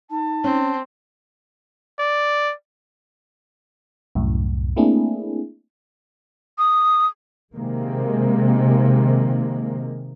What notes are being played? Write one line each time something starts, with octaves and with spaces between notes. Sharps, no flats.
D#4 A5
C4 C#4
D5
C2 F#2 A2
A3 A#3 C4 D4 E4 G#4
D#6
C3 D#3 G#3 A#3